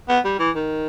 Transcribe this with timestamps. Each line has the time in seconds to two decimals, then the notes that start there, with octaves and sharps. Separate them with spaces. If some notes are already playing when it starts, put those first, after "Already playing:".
0.08 B3
0.25 G3
0.39 E3
0.56 D#3